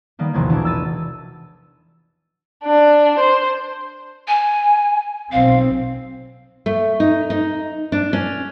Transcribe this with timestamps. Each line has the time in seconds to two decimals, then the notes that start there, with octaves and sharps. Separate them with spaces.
0.19 D#3 G3 A#3 B3
0.34 E1 A#1 C3 D#3 F#4 G#6
0.50 E3 G#3 D4 E4
0.65 E6 A6 D#7
2.64 D4
3.19 C5
4.28 G#5
5.32 B1 C4 F5
6.66 A3
7.00 D#4
7.30 D#4
7.92 D4
8.13 C#4